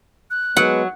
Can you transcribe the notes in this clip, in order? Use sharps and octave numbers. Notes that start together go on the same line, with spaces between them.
F#6
F#3 G#3 B3 F#5